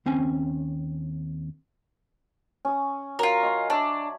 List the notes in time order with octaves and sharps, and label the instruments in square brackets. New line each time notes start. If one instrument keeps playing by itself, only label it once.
[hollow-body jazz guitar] D#2 C4 C#4 G#5
[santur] C#4 D#6
[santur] F#3 [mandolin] F4 A#4
[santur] D#5 G#5 C6
[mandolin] D4 [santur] C#5 E5